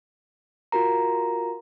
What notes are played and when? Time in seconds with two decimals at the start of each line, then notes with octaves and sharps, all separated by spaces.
0.72 F4 F#4 A#4 A#5